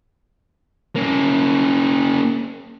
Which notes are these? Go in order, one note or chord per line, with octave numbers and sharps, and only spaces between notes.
A#3 C#4